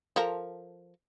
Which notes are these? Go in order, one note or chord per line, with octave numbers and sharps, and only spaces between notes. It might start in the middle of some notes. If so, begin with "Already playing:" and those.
F3 A4 A#4